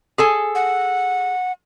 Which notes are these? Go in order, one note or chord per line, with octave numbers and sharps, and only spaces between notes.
G#4 A4 G#5
F#5